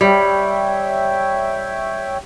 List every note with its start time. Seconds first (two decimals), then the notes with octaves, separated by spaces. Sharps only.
0.01 G3 C#5 E5 G5